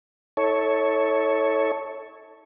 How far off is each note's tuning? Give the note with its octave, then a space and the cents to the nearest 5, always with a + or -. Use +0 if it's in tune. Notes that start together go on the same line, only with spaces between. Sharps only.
E4 -45 A4 +0 C#5 +0